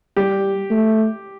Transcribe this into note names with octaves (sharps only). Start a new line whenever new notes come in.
G3 G4
A3